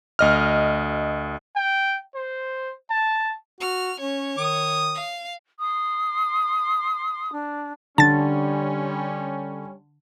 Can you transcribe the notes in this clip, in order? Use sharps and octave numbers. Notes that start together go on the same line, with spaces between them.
D2 D#5 F6
G5
C5
A5
F#4 F6
C#4 C#5
D#3 D#6
F5
C6 D#6
D4
D3 G3 C#4 A5 A6